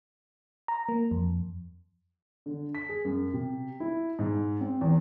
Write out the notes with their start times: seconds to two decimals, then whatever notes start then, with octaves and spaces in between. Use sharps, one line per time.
0.68 A#5
0.89 A#3
1.11 F2
2.46 D3
2.75 B6
2.89 G#4
3.05 F#2
3.33 C3
3.80 E4
4.19 G#2
4.60 C4
4.81 E2